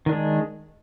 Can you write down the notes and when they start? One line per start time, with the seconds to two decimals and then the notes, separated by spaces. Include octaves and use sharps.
0.06 D#3
0.09 D4
0.12 G#3